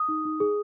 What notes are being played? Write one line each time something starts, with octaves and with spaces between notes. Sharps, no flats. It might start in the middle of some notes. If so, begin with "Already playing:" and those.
Already playing: D#6
D#4
D#4
G#4